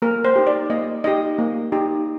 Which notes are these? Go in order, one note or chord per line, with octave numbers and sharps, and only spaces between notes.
A#3 A#4
C5
D#4 G4
D5
A#3 D#5
D#4 G4 D#5
A#3
D#4 G4